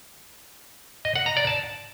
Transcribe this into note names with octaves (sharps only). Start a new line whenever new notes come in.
D#5
F#5
A#5
D5
A5